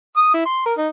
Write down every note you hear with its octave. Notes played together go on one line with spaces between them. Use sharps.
D#6
E4
C6
A#4
D#4